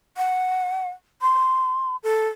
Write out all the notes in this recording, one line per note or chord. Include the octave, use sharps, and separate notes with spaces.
F#5
C6
A4